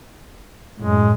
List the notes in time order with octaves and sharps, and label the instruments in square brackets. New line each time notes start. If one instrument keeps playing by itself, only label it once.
[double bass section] F#2 A2 [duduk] G#3